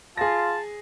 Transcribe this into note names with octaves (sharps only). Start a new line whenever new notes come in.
F4 G#4 A5 A#6